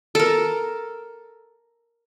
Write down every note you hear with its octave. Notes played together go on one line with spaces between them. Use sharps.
A4 A#4